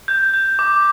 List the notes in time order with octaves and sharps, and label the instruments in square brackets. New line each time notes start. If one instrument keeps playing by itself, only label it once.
[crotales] G6
G6
D6